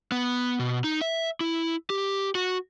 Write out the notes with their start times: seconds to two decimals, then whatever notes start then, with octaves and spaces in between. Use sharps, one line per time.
0.12 B3
0.60 B2
0.84 D#4
1.01 E5
1.41 E4
1.90 G4
2.35 F#4